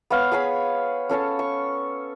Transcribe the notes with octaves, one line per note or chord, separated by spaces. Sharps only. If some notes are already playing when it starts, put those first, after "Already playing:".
B3 C#5 F5
G#4 C#5 G#5 B5
C#4 A4 C#5 A5
C#6